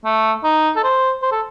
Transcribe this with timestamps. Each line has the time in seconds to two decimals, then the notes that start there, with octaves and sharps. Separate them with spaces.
0.05 A3
0.44 D#4
0.76 A4
0.84 C5
1.23 C5
1.32 A4